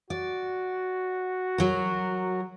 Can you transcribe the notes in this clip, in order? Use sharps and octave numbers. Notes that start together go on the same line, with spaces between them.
F#4 D5
F#3 A#4